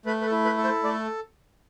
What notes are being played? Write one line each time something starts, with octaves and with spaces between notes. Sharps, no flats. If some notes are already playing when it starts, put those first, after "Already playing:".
A3 B4
B4
A4
E4
B4
A4
C5
A3 D5